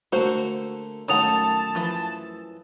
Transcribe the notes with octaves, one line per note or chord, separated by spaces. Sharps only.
D3 A3 A#3 F#4 C5
F#2 D#3 A3 C#5 F#5 A5 D#6 F7
E3 F3